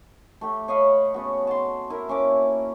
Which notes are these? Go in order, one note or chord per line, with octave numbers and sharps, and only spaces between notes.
A3 G4
C#5 D#5 F5 B5
C#3 B3 F#4
A5 C6
E4 A#4
A#3 C#4 E5 D6